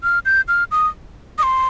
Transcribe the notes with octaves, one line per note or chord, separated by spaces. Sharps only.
F6
G6
F6
D#6
D#6
C6